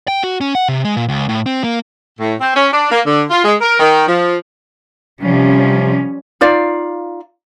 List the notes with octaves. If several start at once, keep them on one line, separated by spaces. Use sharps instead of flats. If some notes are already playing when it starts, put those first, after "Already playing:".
G5
F#4
C#4
F#5
C3
G#3
A#2
C#2
A2
C4
A#3
A2
C4
C#4
D4
A#3
D3
F4
G#3
A#4
D#3
F3
C3 F3 G3 C#4
D#4 F4 D5 F5